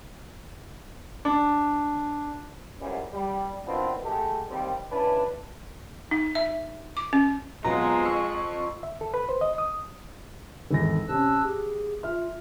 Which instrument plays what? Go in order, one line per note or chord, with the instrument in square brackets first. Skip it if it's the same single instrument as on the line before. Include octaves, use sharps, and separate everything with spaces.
[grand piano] D4
[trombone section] C#2 F#2 C3 E3 G3 C#4
G3
B2 D#3 C4 D4 E4 F4
G#3 A3 F#4 G4 A4
D#2 G3 C4
C#2 C#4 D4 E4 B4
[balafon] D#4
E5
D6
C#4
[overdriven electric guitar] F2 F4 [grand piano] B2 F#3 [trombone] G#3 [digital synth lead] A#5
[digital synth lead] C#6 [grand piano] E6
[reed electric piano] E5
A4
B4
C5
D#5
D#6
[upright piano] G#1 E2 A#6 [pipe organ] A4
[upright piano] C3 C#4 [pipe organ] A5 E6 F#6
[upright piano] G4 [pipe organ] G#4
[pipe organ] F4 [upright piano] E5 F6